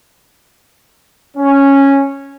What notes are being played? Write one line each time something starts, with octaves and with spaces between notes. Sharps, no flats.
C#4